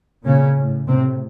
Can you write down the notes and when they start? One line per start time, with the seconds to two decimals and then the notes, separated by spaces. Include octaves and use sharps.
0.25 A#2 C#3 C#4
0.57 A2
0.88 A2 C3 C4